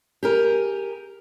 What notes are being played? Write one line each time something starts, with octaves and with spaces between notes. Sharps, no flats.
G4 G#4 A#4